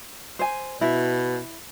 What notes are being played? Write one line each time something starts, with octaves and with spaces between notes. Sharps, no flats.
C5 G#5
B2 E4